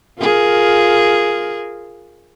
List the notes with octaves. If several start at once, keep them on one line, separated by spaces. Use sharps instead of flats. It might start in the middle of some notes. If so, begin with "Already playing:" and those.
F4 G#4 A#4